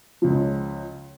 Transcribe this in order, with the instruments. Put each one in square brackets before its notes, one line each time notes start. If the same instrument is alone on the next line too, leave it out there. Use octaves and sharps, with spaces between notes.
[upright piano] C#2 C#3 F3